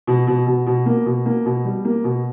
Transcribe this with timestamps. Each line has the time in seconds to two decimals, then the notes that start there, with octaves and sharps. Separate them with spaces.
0.07 B2
0.27 B2
0.47 B2
0.67 B2
0.86 A#3
1.06 B2
1.26 A#3
1.46 B2
1.65 G3
1.85 A#3
2.04 B2